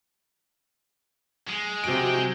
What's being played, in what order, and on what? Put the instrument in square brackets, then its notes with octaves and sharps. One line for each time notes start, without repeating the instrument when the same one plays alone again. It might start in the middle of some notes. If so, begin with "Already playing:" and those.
[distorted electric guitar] G#3
[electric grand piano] C3 D7 [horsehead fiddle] F#4 G5